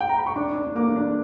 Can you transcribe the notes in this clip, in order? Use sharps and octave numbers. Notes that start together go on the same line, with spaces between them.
G5
A#5
B5
C#6
D4 D6
D4
A#3 D6
D4